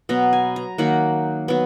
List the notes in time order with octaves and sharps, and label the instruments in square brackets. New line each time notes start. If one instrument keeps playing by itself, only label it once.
[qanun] B2 F#3 B3 A#5
G#5
A#5
D#3 F#3 A#3 F#5
F#3 B3